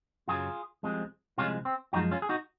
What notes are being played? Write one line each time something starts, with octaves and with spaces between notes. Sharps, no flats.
F#2 C#3 F#3 F4 G#4
C2 C3 F3 G#3
C2 C3 F3 G#3 C#4 F4
C4
F#2 F3 G#3 D#4 F#4
C#4 F4
G#4
D#4 F#4